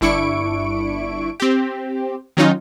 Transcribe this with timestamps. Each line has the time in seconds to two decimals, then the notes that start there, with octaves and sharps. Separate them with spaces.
0.01 G1 D4 E4 C#6 D7
1.40 C4 G4
2.37 D#3 F#3 C#4 D#4 F4